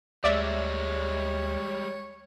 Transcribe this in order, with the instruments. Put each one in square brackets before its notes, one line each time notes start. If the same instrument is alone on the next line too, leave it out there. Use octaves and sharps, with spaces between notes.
[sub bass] D2 [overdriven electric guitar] G3 G#3 [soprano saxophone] C#5 [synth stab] D5 E5